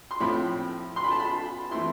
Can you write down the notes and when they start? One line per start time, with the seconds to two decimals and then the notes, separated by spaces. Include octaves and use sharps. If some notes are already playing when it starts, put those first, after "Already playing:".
0.11 C6
0.20 A2 F3 C4 B5
0.96 C6
1.04 B5
1.11 A5
1.20 B5
1.71 E3 A3 C4 E4 C6